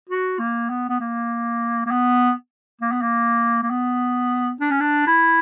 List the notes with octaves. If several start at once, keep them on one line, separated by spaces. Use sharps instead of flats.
F#4
A#3
B3
B3
A#3
A#3
B3
A#3
B3
A#3
A#3
B3
D4
C#4
D4
E4